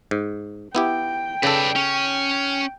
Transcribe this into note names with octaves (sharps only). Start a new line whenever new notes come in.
G#2
B3 E4 G4 G5
C#3 A4 B4 D5
C#4